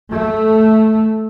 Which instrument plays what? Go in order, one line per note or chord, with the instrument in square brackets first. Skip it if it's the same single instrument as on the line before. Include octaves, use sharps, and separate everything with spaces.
[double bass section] A3